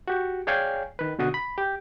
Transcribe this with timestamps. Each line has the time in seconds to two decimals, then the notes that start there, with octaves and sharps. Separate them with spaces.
0.08 F#4 G4
0.47 G#4 C#5 D5 F5 G5 G#5
0.99 D#3 B4
1.19 B2 D3 F#4 D#6
1.34 B5
1.58 G4